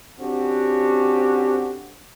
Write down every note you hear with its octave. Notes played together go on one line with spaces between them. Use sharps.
D3 C4 C#4 F#4 G4